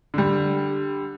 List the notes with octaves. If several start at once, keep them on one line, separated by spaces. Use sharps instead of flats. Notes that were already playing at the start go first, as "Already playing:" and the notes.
D3 G3